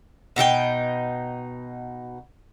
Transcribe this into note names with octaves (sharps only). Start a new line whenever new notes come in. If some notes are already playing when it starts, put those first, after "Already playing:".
B2 D#4 A4 G5